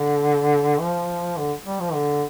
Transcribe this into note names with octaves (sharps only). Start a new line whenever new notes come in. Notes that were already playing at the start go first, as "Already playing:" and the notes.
Already playing: D3
F3
D3
G3
F3
D3